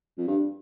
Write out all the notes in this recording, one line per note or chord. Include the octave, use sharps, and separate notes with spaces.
F2
G2